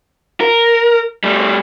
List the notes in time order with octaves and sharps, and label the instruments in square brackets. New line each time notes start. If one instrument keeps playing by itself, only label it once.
[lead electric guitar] A#4
G3 A3